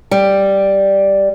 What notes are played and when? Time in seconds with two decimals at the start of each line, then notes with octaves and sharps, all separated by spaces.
0.11 G3